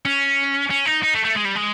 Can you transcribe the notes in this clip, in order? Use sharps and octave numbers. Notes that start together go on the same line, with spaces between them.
C#4
C#4
D#4
D#4
A3
A3
G#3
G3
G#3